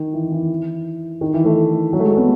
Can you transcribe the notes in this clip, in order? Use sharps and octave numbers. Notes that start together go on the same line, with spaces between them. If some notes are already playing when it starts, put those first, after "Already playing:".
Already playing: D#3
E3
E3
D#3
E3
A3
F#3
A3
G#3
B3